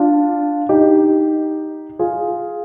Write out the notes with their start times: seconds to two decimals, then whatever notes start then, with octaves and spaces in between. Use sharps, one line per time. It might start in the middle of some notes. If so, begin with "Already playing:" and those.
Already playing: D4 F4
0.69 D#4 G4
1.99 F4 G#4